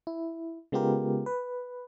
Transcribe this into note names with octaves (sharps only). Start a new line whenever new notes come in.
E4
C#3 G#3 B3 F4 G4 A#4
B4